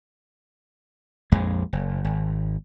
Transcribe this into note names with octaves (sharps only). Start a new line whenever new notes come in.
A#1 F2 G#3
F#1
G#1